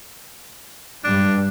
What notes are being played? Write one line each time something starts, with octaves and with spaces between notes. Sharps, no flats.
G2 G3 D4